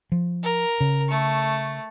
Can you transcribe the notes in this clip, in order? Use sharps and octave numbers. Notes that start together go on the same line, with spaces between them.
F3
A#4
C#3
A3 C#6